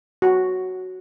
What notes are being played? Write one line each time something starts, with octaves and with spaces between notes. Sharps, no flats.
F#4